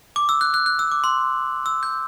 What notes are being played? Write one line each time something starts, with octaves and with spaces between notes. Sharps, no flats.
D6
E6
F#6
F#6
F#6
E6
D6
C6
E6
G6